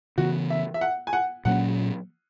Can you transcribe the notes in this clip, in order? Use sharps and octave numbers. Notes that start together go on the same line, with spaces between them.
C#3 E3 B3 F#4
E5
E5
F#5
G#5
F#5
A#2 F#3 A#3 C#4 F#5